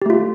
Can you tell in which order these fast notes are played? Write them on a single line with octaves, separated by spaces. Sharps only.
G4 A3 F4